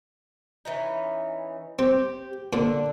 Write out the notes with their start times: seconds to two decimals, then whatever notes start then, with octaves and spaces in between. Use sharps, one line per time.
0.65 E3 C#4 D#4
1.79 C4 G4
2.53 A#2 D3